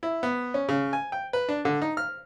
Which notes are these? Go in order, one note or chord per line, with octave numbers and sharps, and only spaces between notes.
E4
B3
C#4
C#3
G#5
G5
B4
D4
D3
D#4
F6